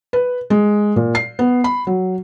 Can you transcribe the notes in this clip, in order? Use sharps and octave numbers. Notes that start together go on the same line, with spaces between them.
B4
G#3
A#2
C7
B3
B5
F#3